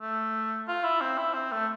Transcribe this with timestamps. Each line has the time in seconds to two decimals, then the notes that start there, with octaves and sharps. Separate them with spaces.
0.01 A3
0.68 F4
0.84 E4
1.01 C4
1.18 E4
1.34 C4
1.52 A3